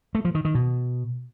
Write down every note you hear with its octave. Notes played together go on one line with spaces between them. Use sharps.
A3
F3
D#3
D#3
B2